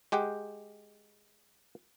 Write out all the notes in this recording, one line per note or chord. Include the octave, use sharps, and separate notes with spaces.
G#3 G4 F#5 G5